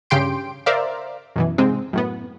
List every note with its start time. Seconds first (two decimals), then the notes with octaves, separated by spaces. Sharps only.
0.10 G2 C#3 G4 G5 C6 D7
0.66 A#4 C5 D5 E5 F5
1.36 F#2 B2 E3
1.58 G#2 C3 G#3 C4
1.93 F#2 A2 B3